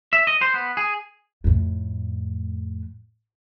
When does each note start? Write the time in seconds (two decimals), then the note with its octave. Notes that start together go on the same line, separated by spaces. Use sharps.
0.13 E5
0.27 D#5
0.41 C5
0.54 B3
0.77 G#4
1.44 F2 A2